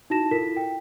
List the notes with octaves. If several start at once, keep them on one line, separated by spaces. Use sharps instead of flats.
D#4 E4 F#4 A5 A#6 E7
E4 F4 A4 A#4 B6
G5